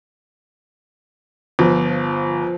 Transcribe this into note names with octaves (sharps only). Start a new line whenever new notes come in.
G1 F3